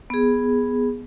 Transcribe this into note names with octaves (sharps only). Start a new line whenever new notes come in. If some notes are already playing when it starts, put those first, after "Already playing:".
B3 G#4